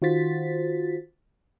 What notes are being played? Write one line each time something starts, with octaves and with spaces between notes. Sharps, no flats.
D#3 F4 F#4 C5 A6 B6